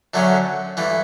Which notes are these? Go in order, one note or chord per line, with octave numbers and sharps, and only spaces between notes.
F#2 D3 F#3 A3 C#4
G2 E3 A3